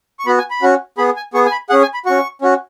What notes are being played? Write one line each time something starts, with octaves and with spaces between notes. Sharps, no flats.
C#6
B3 F#4 B5
G#5
B5
C#4 F#4
B3 G#4 B5
G#5
B3 G#4 C#6
G#5
B5
C#4 G#4 F#5
G#5
B5
C#4 F#4 C#6
C#4 F#4